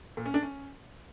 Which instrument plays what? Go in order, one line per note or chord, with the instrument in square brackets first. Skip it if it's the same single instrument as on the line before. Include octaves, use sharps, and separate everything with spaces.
[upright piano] A#2
C#4
D4
C#4